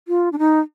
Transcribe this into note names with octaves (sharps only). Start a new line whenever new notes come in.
F4
D4
D#4